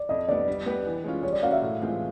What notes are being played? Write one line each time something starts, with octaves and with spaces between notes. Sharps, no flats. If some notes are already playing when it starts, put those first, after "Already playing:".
Already playing: D5
F2 D#5
D3 G3 B3 D5
G3
B3 D4 G4 B4
E3
G#3 C#4 F4
G3 C#5
D5
A#3 C#4 F#4 F5
E5
A2
E3 G#3 C4 F4